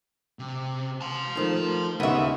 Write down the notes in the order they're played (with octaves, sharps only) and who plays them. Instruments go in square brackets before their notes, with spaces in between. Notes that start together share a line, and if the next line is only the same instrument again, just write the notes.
[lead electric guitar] C3
A5 C6
[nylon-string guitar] D#3 F3 A3
[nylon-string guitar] D#2 F#4 [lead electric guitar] C#3 [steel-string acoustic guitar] B3 E5